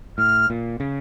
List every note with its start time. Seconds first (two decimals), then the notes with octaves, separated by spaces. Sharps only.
0.18 A2 F6
0.50 A#2
0.80 C#3